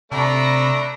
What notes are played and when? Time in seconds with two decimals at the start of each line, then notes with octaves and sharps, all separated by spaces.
0.12 C3 A3 D4 A#5 B5